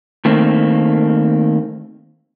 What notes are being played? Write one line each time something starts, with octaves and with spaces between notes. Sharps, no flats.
D#3 A3 A#3 C4